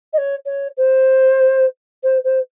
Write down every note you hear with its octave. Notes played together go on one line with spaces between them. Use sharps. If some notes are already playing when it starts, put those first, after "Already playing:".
D#5
C#5
C#5
C5
C5
C5